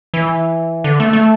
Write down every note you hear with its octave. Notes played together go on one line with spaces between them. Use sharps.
E3
D3
A3
A3